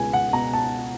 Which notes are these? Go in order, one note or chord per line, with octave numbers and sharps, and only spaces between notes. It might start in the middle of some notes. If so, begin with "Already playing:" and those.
Already playing: C#2 B2 G#5
F#5
B2 A#5
A5